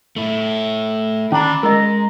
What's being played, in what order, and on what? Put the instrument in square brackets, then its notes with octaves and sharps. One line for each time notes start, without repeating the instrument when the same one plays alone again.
[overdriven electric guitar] A3 E4
[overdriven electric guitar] D#3 B5 [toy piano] C#4 A#5 [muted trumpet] D4
[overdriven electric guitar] G#3 [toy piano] A#4 D#5 [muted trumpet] A#5